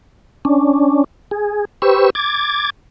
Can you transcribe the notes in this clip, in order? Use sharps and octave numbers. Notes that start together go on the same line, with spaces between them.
C#4 D4
G#4
G4 B4 C5 C#6 E6
D6 G#6 A6